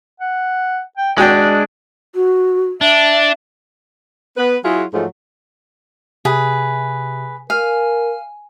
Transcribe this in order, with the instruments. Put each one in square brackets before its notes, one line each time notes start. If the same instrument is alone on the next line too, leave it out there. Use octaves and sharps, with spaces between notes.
[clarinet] F#5
G5
[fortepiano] G#1 F#4 G5 [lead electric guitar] G#3 D4 [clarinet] D5
[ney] F#4
[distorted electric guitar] D4 [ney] E5
[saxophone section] B3 B4
F#3 E4 F4 G#4
G#2 F3 F#3 G#3 A3
[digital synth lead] C3 [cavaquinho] G#4 B4
[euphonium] A#4 [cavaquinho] F5 [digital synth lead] G#5